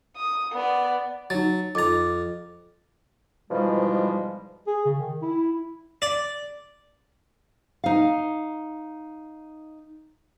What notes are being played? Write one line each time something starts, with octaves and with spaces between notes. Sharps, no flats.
D#6
B3 D5
F#3 D#4 A6
F2 A#5 D6 A6
G#2 B2 E3 F3 G3 G#3
G#4
C#3
D#3
E4
D5
D#4 F5